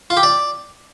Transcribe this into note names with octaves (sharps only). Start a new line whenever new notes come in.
F4
G4
D5